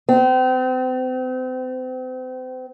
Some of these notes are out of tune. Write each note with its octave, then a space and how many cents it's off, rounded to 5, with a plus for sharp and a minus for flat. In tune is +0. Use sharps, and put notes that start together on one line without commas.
C4 -35